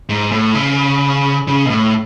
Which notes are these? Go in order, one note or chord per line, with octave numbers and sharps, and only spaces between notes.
G#2
A2
C#3
C#3
B2
A2